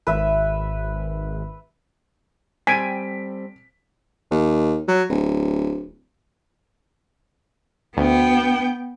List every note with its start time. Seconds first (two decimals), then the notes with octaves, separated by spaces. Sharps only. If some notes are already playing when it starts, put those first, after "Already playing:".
0.07 G#1 B4 E5
2.67 G3 C4 A4 G#5 B6 D7
4.31 D#2
4.88 F#3
5.09 D1
7.97 D2 B3 G5